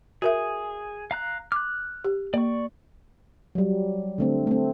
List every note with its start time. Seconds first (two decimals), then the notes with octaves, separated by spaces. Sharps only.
0.22 F#4 G#4 A#4 E5
1.11 F5 A#5 F#6
1.52 D6 F6 F#6
2.04 G4
2.34 A#3 D5 C#6
3.55 F#3 G3
4.18 D3 A3 C4
4.47 A3 C4